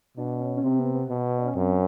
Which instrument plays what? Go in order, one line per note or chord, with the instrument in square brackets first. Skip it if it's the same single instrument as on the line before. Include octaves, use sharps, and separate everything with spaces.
[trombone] B2 [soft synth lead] D4
[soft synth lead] C#4
C#4
[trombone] C3 [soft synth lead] C4
[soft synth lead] B3
B3
[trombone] B2
[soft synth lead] D4
C#4
[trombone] F#2 [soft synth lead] C4